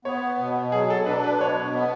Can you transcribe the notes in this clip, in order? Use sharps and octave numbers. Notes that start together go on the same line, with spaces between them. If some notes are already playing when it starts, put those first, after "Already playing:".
B3 C#5
B2
F#3 G#4
A4
D4 B4
B4
B2 C#5
B3